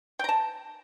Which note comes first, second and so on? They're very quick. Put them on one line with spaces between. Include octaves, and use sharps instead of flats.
G5 A#5 A5